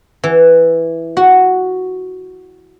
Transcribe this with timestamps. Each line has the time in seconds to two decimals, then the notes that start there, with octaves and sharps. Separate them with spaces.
0.24 E3
1.17 F#4